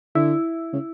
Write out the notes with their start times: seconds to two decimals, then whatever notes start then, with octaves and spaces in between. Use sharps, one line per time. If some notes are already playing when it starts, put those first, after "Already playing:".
0.15 D3 E4
0.73 C#3